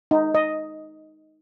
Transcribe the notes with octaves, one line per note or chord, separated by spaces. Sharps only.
D#4
D#5